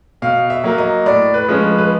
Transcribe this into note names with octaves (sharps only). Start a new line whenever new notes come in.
B2 F5
E5
F#3 A#3
D#5
A2 D5
B4
F3 G#3 C#4
B4
B4